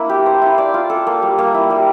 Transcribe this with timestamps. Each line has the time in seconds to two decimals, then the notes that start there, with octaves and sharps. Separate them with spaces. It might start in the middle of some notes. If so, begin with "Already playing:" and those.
Already playing: A#3 D4 E4
0.09 G4
0.26 C5
0.42 E4
0.58 D5
0.74 F4
0.90 A4
1.07 A#3
1.22 G3
1.39 A#3
1.54 E4
1.70 G3